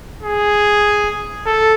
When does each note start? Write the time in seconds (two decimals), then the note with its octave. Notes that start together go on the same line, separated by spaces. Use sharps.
0.23 G#4
1.46 A4